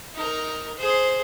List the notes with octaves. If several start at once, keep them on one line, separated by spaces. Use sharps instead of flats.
D#4 A#4
G#4 C5